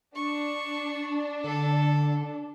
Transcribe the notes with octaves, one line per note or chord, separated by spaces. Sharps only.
D4 C#6
D3 A4